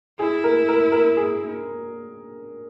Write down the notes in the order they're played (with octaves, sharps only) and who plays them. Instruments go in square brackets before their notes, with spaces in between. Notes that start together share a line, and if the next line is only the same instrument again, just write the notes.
[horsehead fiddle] E4 [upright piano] G#4
[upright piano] A#4
A#4
A#4
G#4